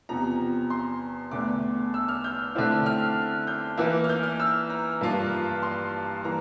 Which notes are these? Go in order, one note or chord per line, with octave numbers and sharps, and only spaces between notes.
E2 C3 F3 A#5
C6
E2 D3 A3 D6
E6
F6
G6
D3 A3 C4 E4
F6
G6
E3 A#3 E4
F6
G6
F6
E6
A#5
G2 F3 A#3 F4
C6
E3 A#3 A#5